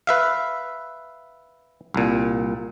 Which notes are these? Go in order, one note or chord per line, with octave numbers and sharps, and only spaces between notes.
B4 E5 F5
C2 A#2